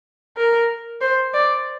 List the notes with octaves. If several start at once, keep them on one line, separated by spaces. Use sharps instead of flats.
A#4
C5
D5